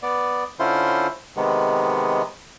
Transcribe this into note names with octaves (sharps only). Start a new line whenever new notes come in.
B3 D5
D3 C#4 E4 F4 C5 C6
C3 D#3 G#3 B3